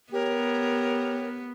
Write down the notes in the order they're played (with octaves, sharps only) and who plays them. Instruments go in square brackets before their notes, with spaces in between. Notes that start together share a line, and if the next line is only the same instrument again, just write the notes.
[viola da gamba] B3 [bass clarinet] G4 [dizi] A#4 [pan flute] C#5